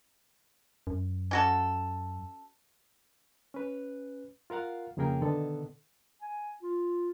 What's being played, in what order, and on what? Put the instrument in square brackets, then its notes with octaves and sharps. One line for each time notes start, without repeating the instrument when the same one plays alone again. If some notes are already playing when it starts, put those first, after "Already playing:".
[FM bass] F#2
[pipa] C#4 F#4 A4
[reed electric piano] C#4 B4
F4 A#4 F5 F#5
F2 C#3 A#3 G#4 A#4 G5
B2 D3 D#3 B3 A4
[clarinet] G#5
F4